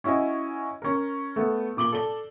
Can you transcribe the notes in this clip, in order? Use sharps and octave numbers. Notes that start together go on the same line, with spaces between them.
C#4 E4 F#4 D#5 G#5
C#4 A#4
A3 B3
A#2 D6 F#7 G7
A4 D5 G7